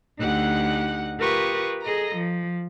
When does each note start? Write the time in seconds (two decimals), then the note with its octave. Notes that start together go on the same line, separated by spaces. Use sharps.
0.18 D2 D#4 G4 F#5 F#6
1.19 F4 G4 A#4 B4 C#6 D#6
1.82 G#4 A4 D#5 A#5
2.16 F3